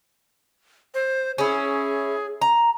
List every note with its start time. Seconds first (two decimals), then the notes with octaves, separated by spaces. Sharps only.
0.94 C5
1.38 C#4 E4 G#4
2.42 A#5